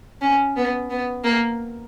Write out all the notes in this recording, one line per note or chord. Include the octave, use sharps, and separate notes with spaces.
C#4
B3
B3
A#3